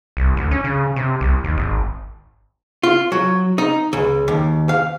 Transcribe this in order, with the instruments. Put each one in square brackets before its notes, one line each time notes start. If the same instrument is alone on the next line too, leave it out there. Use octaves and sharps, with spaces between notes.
[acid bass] C2
D2
C#4
C#3
C3
C2
D#2
G#1
[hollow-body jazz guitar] F4
F#3
D#4
C#2
D#2
F5